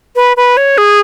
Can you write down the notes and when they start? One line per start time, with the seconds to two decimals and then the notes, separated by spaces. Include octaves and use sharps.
0.16 B4
0.37 B4
0.57 C#5
0.78 G#4